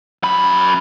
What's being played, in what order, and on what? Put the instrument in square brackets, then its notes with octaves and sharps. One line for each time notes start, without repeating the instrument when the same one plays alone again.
[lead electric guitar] F#2 B5